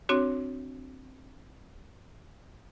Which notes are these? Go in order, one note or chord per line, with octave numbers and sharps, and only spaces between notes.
C4 D4 F#4 C#5